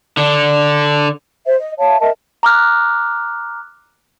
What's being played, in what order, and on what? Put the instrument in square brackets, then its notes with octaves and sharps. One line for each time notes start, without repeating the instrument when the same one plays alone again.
[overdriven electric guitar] D3 D4
[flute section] C5 E5
D#5
C#5 E5 F5 A5
A#4 D#5 E5 A5
[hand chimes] A#5 D6 F6 F#6